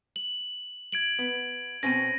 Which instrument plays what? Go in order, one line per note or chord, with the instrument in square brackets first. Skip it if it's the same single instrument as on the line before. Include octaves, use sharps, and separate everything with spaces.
[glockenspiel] F#7
G#6 D7 F#7
[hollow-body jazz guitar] B3
[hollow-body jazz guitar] B2 C4 C#4 [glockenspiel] A#6 D#7